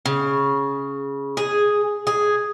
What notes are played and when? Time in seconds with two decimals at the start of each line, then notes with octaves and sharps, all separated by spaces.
0.06 C#3
1.37 G#4
2.07 G#4